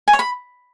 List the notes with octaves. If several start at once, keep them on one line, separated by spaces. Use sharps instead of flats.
G#5
C#5
B5